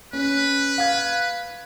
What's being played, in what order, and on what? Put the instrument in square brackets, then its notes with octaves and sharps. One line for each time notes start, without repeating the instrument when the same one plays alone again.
[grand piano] C#4 [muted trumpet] B4
[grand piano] F5 G#6